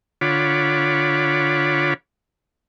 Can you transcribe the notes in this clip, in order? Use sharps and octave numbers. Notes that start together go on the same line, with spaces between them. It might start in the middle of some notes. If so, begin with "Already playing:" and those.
D3 F4 C#5 F#5 B5 D6